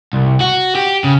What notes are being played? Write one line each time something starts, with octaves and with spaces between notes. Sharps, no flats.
C2
F#4
G4
C#3